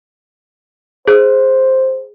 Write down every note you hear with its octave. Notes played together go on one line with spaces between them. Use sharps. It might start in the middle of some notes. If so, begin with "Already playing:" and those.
G#4 C5